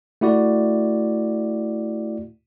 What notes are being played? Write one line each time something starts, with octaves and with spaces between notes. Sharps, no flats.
A3 E4 F#4 D5